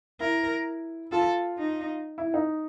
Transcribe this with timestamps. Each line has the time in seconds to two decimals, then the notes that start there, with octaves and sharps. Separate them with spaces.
0.20 E4 A#4
1.12 F4 A4
1.57 D#4
2.18 E4
2.34 D#4